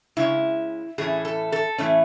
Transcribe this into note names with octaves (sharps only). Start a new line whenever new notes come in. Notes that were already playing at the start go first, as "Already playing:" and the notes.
C#3 G#3 C#4 E4
A2 E3 A3 C#4 G#4
A4
A4
A2 E3 A3 C#4